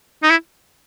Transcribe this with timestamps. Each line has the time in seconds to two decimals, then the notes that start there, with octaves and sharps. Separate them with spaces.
0.23 D#4
0.31 E4